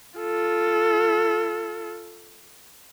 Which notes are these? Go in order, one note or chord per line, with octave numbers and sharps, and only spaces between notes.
F4 A4